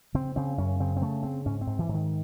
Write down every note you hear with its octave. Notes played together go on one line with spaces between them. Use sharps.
C#3 C4
C#3 C4
F#2 C#4
C#3 C4
C4
C#3 A3
C#3 C4
G#2 C#4
C4
G#2
E3
G#2
D#3